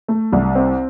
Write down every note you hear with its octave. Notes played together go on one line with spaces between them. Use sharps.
A3
C2
C4